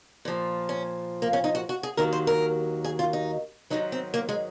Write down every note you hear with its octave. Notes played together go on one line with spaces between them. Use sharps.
A#2 F3
C#4
A#3
C#4
D#4
F#4
F#4
G#4
D#2 D#3 F#3 A#4
C5
A#4
G#4
F4
D#4
G#2 D#3 F#3 D#4
C4
A#3
G#3